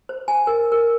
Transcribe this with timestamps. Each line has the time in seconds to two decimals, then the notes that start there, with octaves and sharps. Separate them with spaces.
0.09 C5
0.28 G#5
0.47 A#4
0.72 A#4